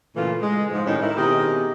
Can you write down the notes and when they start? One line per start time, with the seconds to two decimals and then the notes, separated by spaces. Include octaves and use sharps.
0.15 A#2 C#3 E3 A3 F4
0.41 G#3
0.70 G#2 F3
0.85 A2 D#3 G3 C#4 D#4
1.01 E4 A#4
1.16 B2 D#3 C4 D#4 G4 G#4